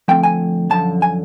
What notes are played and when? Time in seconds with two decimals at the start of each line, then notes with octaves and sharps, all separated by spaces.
0.08 D3 F3 A3 C4 G5
0.23 G#5
0.70 F#2 D3 F3 A5
1.02 G#5